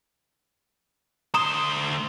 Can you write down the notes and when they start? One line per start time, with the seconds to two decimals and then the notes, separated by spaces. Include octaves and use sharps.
1.34 D2 A#5 C6 D#6 E7